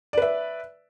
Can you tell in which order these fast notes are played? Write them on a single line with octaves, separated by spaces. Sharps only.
D5 B4 E5